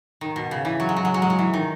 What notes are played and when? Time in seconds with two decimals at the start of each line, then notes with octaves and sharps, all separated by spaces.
0.21 D#3
0.36 B2
0.51 C#3
0.65 E3
0.80 F#3
0.89 G#3
0.96 F#3
1.05 G#3
1.14 F#3
1.22 G#3
1.30 F#3
1.39 E3
1.54 D#3